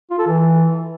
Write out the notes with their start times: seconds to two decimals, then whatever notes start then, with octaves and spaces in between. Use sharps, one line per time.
0.10 F4
0.19 A4
0.27 E3